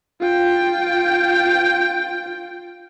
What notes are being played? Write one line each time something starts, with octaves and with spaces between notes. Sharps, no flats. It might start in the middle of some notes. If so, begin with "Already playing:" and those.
F4 G5